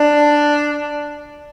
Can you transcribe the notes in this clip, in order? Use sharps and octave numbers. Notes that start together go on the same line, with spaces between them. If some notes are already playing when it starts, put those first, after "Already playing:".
Already playing: D4